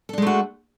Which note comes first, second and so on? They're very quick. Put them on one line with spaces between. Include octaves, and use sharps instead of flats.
A4 D4 G#3 A3 F#4